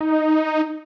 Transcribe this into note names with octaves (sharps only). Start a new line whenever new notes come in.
D#4